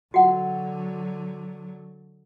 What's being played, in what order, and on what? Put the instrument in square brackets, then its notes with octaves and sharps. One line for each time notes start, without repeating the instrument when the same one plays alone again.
[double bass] D3 F#3 [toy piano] F#4 F#5